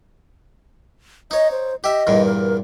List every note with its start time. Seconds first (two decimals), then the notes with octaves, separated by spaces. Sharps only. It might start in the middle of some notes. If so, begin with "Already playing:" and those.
1.31 D#4 C#5 D#5
1.52 C5
1.84 G4 D#5 E5
2.07 E2 G2 A#2
2.26 A#4